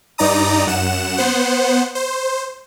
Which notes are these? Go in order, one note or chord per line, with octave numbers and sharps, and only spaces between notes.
G2 D#4 D5 A#5 D#6
F#2 F#5 E7
B3 C5 F#5
C5